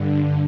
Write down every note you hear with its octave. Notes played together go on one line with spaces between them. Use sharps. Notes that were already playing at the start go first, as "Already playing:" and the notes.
Already playing: G2 D3